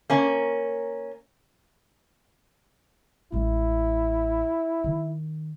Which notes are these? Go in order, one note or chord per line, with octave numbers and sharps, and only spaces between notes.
A#3 C#4
A1 G#3 E4
D#3